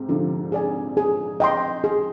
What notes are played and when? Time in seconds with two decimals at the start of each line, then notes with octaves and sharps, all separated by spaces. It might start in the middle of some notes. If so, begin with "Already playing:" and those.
Already playing: G#2 C3
0.09 D3 F3 D4
0.52 G#4 D5 G#5
0.97 G#4
1.40 D#5 G5 C6
1.84 G#4